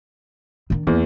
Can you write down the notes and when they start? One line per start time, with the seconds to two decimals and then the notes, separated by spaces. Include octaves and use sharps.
0.70 D#3 D4
0.87 E2 A#3